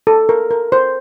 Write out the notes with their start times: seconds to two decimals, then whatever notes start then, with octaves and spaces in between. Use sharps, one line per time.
0.07 A4
0.29 A#4
0.51 A#4
0.72 C5